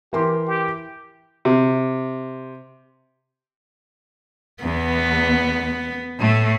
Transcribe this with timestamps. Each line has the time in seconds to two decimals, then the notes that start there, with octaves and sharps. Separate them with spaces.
0.13 E3 G4 A#4 C6
0.47 G4
1.45 C3
4.63 E2 B3
6.19 A2 A3